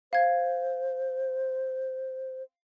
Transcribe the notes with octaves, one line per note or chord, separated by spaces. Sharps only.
C5 F5 G#6